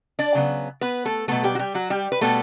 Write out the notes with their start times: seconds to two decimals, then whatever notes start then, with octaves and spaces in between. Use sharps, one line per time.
0.19 D4 D5
0.35 C#3 F#3 B3
0.81 B3 B4
1.05 A3 A4
1.28 B2 F#3 A3 B3 A4
1.44 G3 G4
1.55 F#4
1.59 G3 G4
1.74 F#3 F#4
1.90 G3 G4
2.12 B4
2.21 B2 G3 A3 B3 A4